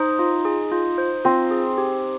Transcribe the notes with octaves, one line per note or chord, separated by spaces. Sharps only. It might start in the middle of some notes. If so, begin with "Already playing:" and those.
Already playing: D#4 C5
F4
G#4
F4
C5
C4 F4
G#4
G4